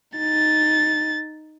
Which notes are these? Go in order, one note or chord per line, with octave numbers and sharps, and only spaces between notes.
D#4 A6